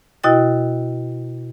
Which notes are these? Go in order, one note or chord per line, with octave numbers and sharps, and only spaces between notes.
B2 E4 F#4 D#5 G5 A6